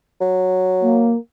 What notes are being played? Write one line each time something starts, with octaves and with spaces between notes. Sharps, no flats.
F#3
A#3